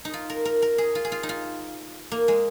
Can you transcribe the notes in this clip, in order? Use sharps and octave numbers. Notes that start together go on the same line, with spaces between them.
D#4
F4
A#4
A#4
A#4
G#4
F4
G#4
F4
D#4
F4
A#3
G#3